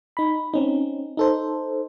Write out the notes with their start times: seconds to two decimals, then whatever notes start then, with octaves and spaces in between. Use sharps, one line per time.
0.17 D#4 B5
0.54 C4 C#4 D#4
1.17 D#4 A4 C5